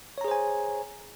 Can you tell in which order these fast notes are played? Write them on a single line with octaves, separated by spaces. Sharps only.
C#5 A#5 G#4 C5 G#5